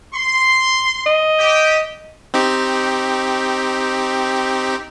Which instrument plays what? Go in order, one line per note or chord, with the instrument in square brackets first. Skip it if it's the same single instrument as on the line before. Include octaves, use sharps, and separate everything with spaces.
[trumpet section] C6
[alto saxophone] D#5
[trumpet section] G4
[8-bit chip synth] C4 D#4 G4